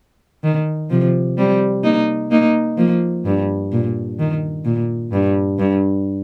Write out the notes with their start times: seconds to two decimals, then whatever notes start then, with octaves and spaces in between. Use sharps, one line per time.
0.43 D#3
0.90 C3 F3
1.38 G3 C4
1.84 A#3 D#4
2.31 A#3 D#4
2.77 F3 A#3
3.25 G2
3.72 A#2
4.19 D#3
4.65 A#2
5.12 G2
5.59 G2